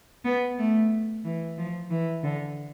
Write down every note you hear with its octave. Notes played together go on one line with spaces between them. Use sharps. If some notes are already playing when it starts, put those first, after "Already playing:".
B3
A3
E3
F3
E3
D3